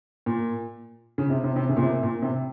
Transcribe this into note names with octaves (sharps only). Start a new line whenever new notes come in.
A#2
C#3
C3
C3
C3
C#3
A#2
C3
A#2
C3